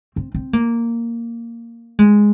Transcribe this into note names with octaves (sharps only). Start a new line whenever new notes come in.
C4
C4
A#3
G#3